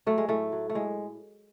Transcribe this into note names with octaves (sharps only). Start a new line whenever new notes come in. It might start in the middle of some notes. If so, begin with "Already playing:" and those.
F#3 A3
G#3
A2 A3
F#3
A3
A2 G#3